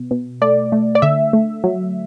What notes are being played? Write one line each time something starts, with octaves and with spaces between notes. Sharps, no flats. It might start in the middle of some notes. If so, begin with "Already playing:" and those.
Already playing: B2
B2
A3 D5
A3
D5
D3 E5
A3
F#3